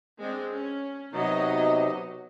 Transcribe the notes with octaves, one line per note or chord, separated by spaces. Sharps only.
G#3 C4 D4
C#4
C3 F#3 B3 D#4 D#5